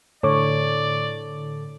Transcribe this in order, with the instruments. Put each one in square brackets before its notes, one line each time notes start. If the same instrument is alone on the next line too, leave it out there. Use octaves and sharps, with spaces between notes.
[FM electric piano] A2 D3 [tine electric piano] A4 D6 [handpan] C#5 [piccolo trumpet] D5